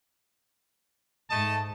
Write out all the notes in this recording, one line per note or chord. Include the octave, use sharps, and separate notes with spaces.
G#2 A3 D#5 A5